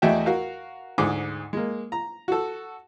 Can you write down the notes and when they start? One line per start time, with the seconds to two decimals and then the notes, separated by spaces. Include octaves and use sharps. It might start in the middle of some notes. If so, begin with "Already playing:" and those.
0.02 E2 A3 F#4 D#5 E5 G5
0.26 F#4 A#4 F5
0.98 D2 G#2 G#4 D6
1.53 G#3 A#3
1.92 A#5
2.28 F#4 A4